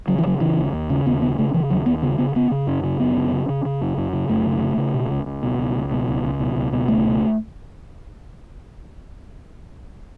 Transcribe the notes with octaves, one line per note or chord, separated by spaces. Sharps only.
C#3 F#3
E3
C#3 F#3
C#3 E3
D#2
D#2
C#3
D#2 B3
C#3 B3
C#3 A3
C#3 E3
D#2 F#3
D#2 B3
C#3 B3
C#3 B3
C#3 B3
C#3
F#2 C#4
C#3
F#2 B3
C#3
C#3
C#3
C#3
F#2
F#2
C#3
F#2 A3
C#3
C#3
C#3
B2
C#2
C#2
B2
C#2
C#2
B2
C#2
C#2
B2
C#2
B2
C#2 A3
B2